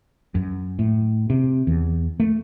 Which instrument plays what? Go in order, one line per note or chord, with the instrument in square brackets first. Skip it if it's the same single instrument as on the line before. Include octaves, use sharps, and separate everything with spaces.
[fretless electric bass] F#2
A2
C3
E2
A3